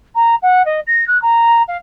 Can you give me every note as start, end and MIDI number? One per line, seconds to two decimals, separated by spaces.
0.15 0.35 82
0.42 0.65 78
0.66 0.80 75
0.87 1.05 94
1.08 1.20 90
1.22 1.63 82
1.68 1.77 77